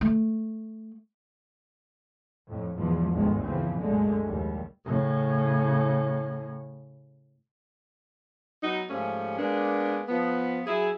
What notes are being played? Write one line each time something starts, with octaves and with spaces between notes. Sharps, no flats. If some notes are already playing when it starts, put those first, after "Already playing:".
A3
F2 A2
E2 G#2 B2 E3 F3 G#3
G1 D2 G#2 D3 D#3 G#3
C#3 E3 F3 C4
C2 F#2 A#2 D3 G#3 A3
A#1 D#2 G3
A2 C#3
F#3 B3 D#4
G#2 F3 G3 A3 C#4
G#3 A#3 B3 D4
F3 B3
F#3 E4 G#4